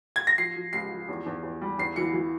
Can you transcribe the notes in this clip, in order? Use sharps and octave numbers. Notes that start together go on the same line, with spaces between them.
G#6
A#6
F3 C7
F3
C#2 C7
F3
E2
E2
E2
G3
E2 C7
E3 C#7
E3